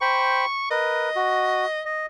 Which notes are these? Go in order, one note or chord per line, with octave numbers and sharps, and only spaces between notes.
C5 G5 B5 C#6
A#4 B4 D#5
F#4
D#5